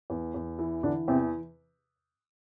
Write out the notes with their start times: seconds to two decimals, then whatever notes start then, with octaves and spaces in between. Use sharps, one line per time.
0.10 E2
0.34 E2
0.59 E3
0.83 D3 E3 D4
1.08 E2 C3 C4